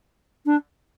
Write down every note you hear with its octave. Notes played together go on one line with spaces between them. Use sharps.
D4